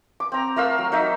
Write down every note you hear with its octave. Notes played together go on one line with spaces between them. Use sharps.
D6
C4 A#5
A3 A#4 F5 E6
F#3
F#3 D#4 E5